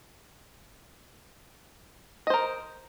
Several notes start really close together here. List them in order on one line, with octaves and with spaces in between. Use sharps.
D#5 C5 A#4